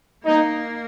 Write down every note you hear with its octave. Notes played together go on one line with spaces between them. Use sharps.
A#3 D#4